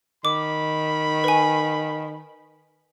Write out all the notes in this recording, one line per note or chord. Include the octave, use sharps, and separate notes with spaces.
D#3 B5 D6
B4 G#5